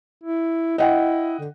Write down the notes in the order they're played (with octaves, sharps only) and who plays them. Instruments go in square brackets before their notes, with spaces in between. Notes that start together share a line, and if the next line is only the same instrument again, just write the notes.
[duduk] E4
[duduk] E4 [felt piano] D#5 F#5 G5
[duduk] D3